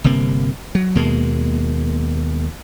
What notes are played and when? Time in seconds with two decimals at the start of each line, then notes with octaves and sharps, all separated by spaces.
0.04 G1 C3 A#3
0.75 F#3
0.95 D#2 B2 G#3 A#3